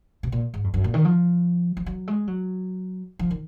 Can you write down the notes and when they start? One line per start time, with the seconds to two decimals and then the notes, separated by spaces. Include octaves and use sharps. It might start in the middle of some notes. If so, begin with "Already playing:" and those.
0.23 B2
0.32 A#2
0.54 G#2
0.64 F2
0.74 F#2
0.84 A#2
0.94 D#3
1.05 F3
1.77 F3
1.86 F#3
2.08 G#3
2.27 F#3
3.19 F3
3.30 D#3